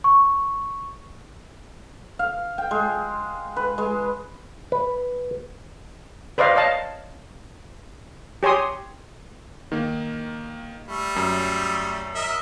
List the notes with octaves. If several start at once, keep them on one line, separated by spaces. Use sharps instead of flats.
C#6
F5
G5
G#3
B4
G#3
B4
B4 C5 D5 D#5 F5
C#5 D#5 F5 A5
G4 C#5 G#5 C6 D#6
D#3 A#3
G3 A3
F#2
A#4 D#5 E5